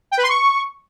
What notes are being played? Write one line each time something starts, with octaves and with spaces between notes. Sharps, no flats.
G5
B4
C6
C#6